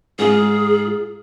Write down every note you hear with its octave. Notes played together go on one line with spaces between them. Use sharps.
G#2 F4 G#4